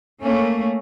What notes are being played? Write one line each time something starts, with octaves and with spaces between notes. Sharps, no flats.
A3 A#3 C#4